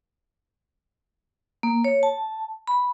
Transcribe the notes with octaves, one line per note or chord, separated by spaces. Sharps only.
A#3
C#5
A5
B5